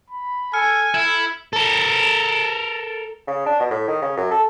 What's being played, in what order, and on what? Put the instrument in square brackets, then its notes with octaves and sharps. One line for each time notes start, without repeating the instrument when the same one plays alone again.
[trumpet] B5
[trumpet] A4 [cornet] G#5 [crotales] F6 C#7
[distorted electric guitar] E4 [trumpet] A4 [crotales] G#6
[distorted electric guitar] A4 A#4
[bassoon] C#3
D4
B2
A2
D#3
C#3
F#2
A4